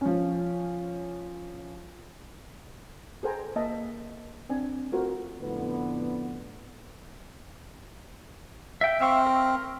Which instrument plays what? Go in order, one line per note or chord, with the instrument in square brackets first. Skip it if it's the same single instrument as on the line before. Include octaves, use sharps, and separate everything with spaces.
[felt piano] F3 C#4
[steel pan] G#4 A4 C5 G5 G#5 A#5
A#3 D#5 E5 A5
C4 D4 G#5
A3 F4 F#4 A#4 C5
[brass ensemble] F2 A2 D3 B3
[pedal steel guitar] E5 G5
[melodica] C4 [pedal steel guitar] E5 F5 C#6
[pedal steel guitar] A#4